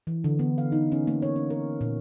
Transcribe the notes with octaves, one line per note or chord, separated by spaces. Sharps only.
E3
D3
B3
F5
D#4
C#4
A#3
C#5
C#4
A#4
A#2